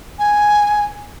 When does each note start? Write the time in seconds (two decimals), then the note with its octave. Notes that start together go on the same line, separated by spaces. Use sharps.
0.19 G#5